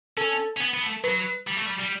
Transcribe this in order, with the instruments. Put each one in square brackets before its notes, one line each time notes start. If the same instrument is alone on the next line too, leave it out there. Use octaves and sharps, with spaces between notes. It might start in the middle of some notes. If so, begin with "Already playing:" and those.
[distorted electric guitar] C#4 [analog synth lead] A4
[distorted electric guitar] C#4
B3
B3
A3
[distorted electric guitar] F#3 [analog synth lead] B4
[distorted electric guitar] G3
A3
G3
G3